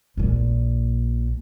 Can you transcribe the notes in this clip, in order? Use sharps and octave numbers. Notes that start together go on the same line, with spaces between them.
A#1 A#2